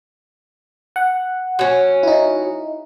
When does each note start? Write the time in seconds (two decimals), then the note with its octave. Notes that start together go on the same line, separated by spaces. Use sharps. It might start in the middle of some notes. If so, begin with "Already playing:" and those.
0.96 F#5
1.59 F#3 C#4
2.03 D#4 E4